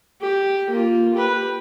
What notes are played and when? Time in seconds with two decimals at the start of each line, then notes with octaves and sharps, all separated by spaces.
0.21 G4
0.69 A#3 F4
1.13 G4 B4